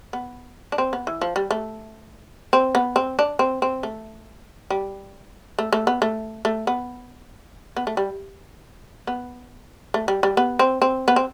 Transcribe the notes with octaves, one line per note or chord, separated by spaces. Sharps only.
B3
D4
C4
B3
E3
F3
G3
A3
C4
B3
C4
D4
C4
C4
A3
G3
A3
A3
B3
A3
A3
B3
B3
A3
G3
B3
A3
G3
G3
B3
C4
C4
B3
C4